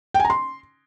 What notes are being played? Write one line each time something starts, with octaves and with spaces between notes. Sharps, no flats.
G5
G#5
A#5
C6